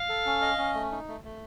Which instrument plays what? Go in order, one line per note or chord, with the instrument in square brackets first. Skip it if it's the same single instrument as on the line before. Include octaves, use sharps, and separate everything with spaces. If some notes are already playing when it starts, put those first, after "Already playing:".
Already playing: [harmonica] F5
[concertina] A4
C#4
D#5
C#4
A3
D#4
A3
A3